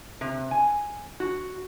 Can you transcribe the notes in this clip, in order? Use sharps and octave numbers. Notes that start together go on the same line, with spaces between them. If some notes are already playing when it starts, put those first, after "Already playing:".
C3
G#5
F#4